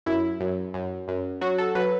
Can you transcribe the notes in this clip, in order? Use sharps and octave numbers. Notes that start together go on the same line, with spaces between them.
F#2 E4
F#2
F#2
F#2
F#3 F#4
A4
F#3 B4